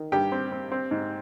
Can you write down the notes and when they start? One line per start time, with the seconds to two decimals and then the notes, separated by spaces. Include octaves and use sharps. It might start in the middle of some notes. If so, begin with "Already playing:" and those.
Already playing: D#3
0.12 G2 G4 G5
0.32 C4
0.52 C4
0.72 C4
0.91 G#2